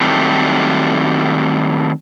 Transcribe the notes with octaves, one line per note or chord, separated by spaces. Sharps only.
D#3 F#3 G3 A3 C4